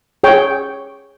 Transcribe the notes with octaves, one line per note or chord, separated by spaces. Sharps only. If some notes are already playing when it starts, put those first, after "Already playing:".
G#4 C#5 G5